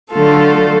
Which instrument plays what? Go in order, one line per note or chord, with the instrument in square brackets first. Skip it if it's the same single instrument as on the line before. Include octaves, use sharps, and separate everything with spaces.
[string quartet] D3 F#3 A3 F4 A4